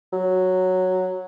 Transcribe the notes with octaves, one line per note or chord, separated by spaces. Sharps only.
F#3